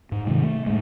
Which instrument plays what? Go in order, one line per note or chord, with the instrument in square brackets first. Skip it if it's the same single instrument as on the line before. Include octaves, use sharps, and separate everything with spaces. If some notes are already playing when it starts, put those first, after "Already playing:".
[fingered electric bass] G#2
C3 D#3 F3 G#3
A3
A2 G#3